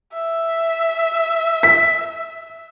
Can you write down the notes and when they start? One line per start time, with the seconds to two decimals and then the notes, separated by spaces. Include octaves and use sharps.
0.13 E5
1.63 B6